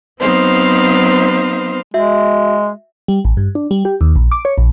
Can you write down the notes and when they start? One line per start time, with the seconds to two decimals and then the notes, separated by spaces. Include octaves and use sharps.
0.20 F#3 B3 C4 D#4 C5 F5
1.94 G#3 F#4 E5
3.08 G3
3.25 A1
3.37 G2
3.55 D4
3.71 G3
3.85 G4
4.01 D#2
4.16 A#1
4.31 D6
4.45 C#5
4.58 A#1